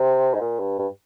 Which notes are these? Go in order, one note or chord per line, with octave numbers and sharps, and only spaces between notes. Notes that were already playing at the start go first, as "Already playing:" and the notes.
Already playing: C3
G#2
A#2
G2
G2